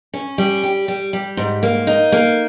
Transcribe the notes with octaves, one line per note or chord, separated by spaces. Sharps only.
C#4
G3
G4
G3
G3
G#2
A#3
D#4
A#3